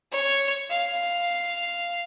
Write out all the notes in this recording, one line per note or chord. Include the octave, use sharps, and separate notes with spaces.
C#5
F5